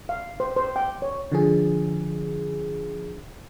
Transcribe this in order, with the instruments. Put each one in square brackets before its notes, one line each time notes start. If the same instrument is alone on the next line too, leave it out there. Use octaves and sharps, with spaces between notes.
[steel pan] F5
C5
C5
G5
C#5
[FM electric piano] D3 F3 G#4